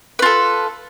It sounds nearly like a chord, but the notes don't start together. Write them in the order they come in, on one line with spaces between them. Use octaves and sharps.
B4 F4 A4